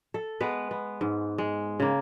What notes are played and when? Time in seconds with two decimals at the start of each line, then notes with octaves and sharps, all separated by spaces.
0.14 A4
0.40 G#3 B3 B4
0.71 B3
1.01 G#2
1.38 G#3
1.80 C#3 A#3